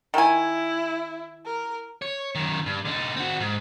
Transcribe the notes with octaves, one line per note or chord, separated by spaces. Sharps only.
D#3 E4 G#5
A#4
C#5
F#2 D#3
G2
D3 D#4
C4 F#4
G#2